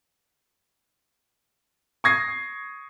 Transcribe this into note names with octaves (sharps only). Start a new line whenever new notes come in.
C#6 D#6 G#6 A#6 C7